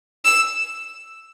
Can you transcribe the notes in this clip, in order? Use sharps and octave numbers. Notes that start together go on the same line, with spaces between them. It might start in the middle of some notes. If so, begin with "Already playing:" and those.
E6